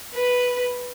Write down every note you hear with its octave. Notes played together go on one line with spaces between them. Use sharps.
B4